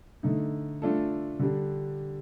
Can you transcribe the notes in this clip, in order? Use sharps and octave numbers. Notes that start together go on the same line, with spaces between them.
D3 A3 D#4
A3 D4 F4 A4
D3 G3 D4